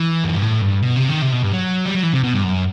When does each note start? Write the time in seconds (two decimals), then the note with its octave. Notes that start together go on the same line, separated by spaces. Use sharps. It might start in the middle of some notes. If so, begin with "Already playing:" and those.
Already playing: E3
0.24 F#2
0.33 G2
0.42 A2
0.61 G2
0.82 B2
0.96 C3
1.09 D#3
1.22 C3
1.32 B2
1.43 G2
1.53 F#3
1.85 G3
1.95 F#3
2.03 E3
2.13 C3
2.23 B2
2.34 G2
2.43 F#2